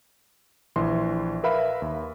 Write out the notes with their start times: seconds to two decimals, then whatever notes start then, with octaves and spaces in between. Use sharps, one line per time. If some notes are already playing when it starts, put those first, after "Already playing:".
0.76 A#1 E3 C6
1.44 A#4 B4 E5 F5 B5
1.82 D#2